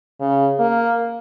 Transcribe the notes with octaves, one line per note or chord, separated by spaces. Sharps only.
C#3
A#3